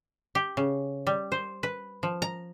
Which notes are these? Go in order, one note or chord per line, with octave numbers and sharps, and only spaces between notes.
G4
C#3
G3
C5
B4
F3
A#5